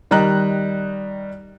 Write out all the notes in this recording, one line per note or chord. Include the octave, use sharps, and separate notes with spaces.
D#3 G3 D#5 A#5 F#6